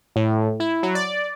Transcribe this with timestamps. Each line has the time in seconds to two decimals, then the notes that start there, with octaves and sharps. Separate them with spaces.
0.16 A2
0.60 E4
0.83 F#3
0.95 D5